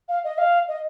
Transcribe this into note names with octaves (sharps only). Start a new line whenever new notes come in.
F5
D#5
F5
D#5